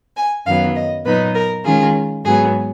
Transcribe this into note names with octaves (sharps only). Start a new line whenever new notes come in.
G#5
F#2 D#3 F#3 B3 F5
D#5
A#2 F#3 B3 D#4 B4
A#4
D#3 G#3 C#4 F4 G#4
G#2 F#3 B3 G#4